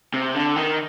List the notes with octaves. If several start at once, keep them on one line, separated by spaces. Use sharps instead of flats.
C3
D3
D#3